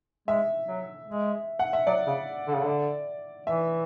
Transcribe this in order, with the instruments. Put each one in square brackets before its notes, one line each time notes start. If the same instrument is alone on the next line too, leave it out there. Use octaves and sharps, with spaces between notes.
[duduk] G#3 [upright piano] E5
[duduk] F#3
G#3
[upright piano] F#5
E5
[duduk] F#3 [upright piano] D5
[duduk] C#3
D3
C#3
D3
[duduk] E3 [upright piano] E5